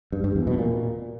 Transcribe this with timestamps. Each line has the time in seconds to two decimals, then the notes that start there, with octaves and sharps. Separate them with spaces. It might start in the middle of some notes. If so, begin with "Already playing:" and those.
0.12 G2
0.24 G2
0.35 E2
0.47 B2
0.58 A#2